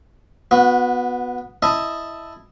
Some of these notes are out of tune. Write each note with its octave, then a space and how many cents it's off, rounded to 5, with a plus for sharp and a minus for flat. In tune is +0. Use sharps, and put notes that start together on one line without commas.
B3 +0 F#4 -30
E4 +0 D#5 +0 A5 +5